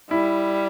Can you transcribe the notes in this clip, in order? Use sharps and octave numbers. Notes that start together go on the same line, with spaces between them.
G3 E4